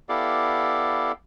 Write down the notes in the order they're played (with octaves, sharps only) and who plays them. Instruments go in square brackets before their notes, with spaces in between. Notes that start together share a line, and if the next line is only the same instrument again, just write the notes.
[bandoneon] B3 E4 G4 A4 D5 F5